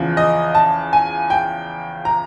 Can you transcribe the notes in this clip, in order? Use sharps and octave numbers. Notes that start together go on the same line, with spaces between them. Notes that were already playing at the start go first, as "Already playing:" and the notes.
Already playing: E2 C#3 F3
D#5
A5
G#5
G5
A#5